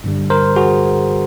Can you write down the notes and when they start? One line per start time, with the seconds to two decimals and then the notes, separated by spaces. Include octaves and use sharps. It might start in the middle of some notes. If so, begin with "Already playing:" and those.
0.04 G2 D3 G3
0.30 A#4 C5
0.56 F#4 G#4